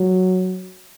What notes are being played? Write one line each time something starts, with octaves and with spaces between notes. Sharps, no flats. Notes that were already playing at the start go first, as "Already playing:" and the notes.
Already playing: F#3